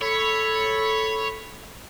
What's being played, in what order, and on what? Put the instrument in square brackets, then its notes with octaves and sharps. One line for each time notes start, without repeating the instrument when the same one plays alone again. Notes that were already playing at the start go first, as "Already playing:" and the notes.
[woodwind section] A4 B5 [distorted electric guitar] C#5